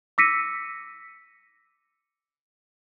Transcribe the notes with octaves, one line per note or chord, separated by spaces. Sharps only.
D6 E6 A#6 B6 C#7 D#7